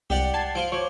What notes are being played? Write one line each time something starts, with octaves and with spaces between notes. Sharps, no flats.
C2 G4 D5 F#5
A5 G#6 C7
F3 F4 D7
F3 C#5 D6